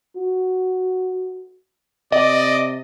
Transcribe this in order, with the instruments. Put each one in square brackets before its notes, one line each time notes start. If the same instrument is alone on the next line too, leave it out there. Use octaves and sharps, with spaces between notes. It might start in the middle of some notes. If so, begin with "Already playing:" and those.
[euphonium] F#4
[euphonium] C3 [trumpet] D5 [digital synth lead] D#5